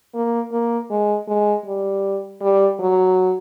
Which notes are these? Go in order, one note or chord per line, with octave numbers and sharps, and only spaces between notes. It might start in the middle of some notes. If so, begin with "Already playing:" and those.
A#3
A#3
G#3
G#3
G3
G3
F#3